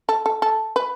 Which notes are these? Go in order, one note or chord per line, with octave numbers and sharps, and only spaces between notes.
A4
A4
A4
B4